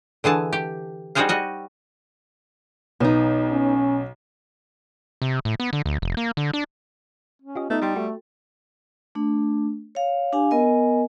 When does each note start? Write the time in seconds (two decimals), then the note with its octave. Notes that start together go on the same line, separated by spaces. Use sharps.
0.24 D3 E3 G#4 A5
0.53 G4
1.15 G3 D#4 F#4 G#4 C5 F5
1.29 G3 F#4 D#5
3.00 B1 B3 D#4
3.51 C#4
5.22 C3
5.45 A2
5.60 B3
5.73 D3
5.86 D2
6.02 F1
6.17 A#3
6.37 D3
6.53 D4
7.42 C#4
7.56 F4 G4 D#5
7.70 A3 B3 D#4
7.82 G3 G5 C6 A6
7.96 A3 F#4 A4
9.15 A3 D4
9.95 C#5 F5
10.33 D4 G4 F5 G#5
10.51 B3 A#4 D#5 G#5